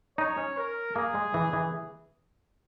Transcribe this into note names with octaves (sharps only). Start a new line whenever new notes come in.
D#4 C#5
C#4
A#4
A#3 G#4
G#3
E3
E3